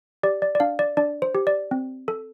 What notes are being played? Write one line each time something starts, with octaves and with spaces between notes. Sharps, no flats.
G4 D5
D5
D5
D4 F5
D5
D4 D5
C5
G4
D5
C4
A4